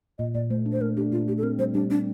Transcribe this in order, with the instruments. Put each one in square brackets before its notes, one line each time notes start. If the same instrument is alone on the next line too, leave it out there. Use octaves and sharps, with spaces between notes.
[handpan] A#2 [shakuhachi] D#5
[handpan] A#2 [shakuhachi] D5
[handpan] A3 [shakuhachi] C5
[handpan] D4
[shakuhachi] C5
[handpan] A3 [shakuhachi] A#4
[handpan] D4 [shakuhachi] G4
[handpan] A#2 [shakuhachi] F4
[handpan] A3 [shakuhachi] G4
[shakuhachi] A4
[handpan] C4 [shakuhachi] A#4
[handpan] G3 [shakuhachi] C5
[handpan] G3 [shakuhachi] D4
[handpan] C4 [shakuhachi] D4